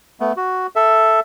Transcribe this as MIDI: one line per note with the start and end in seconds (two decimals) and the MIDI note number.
0.20 0.32 57
0.20 0.32 59
0.37 0.67 66
0.76 1.20 69
0.76 1.20 76